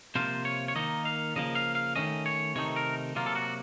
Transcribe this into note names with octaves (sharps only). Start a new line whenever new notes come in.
C3 F3 A#3 F4 C5
C#5
C#5
D#3 A#3 D#4 D#5
F5
C#3 F3 A#3 D#5
F5
F5
D#3 A3 C#4 D#5
C#5
C3 D#3 A3 D#4 C#5
A#4
C3 F#3 A#3 F4
A4
F#4